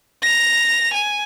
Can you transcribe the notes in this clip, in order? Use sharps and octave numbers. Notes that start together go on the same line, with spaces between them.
A#6 F7
G#5